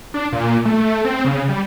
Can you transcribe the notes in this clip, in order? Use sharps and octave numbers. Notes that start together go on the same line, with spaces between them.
D4
A#2
A3
C4
C#3
G3